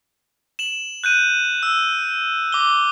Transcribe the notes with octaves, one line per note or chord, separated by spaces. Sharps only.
E7 F#7
F#6 G6 D#7
E6
D6 G7